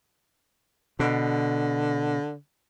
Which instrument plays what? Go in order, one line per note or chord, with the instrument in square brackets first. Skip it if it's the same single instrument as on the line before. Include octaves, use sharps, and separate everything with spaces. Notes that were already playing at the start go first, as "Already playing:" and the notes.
[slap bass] B2 [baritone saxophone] D3